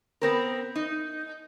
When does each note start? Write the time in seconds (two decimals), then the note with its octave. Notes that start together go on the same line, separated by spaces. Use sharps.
0.22 B3 C4 A#4
0.76 D#4